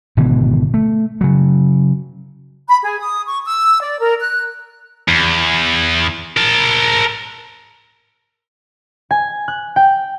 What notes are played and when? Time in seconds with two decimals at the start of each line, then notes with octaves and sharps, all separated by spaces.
0.17 G#1 B2 D3 E3
0.74 A3
1.21 C#3 F#3
2.68 B5
2.84 G#4
3.00 D#6
3.27 C#6
3.45 E6
3.81 D5
4.01 A#4
4.21 F#6
5.08 E2
6.37 A#4 A5
9.11 G#5
9.48 F#6
9.76 G5